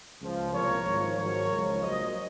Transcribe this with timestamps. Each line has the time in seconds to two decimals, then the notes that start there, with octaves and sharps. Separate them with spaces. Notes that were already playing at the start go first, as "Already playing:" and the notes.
0.21 C#2 C#3 F3
0.53 C2 A#2 F3 A#4 C#5
0.85 G#1 G#2 F3
1.18 G#1 G#2 F#3 A#4 C#5
1.50 C#2 C#3 F3
1.81 A#1 A#2 F#3 C5 D#5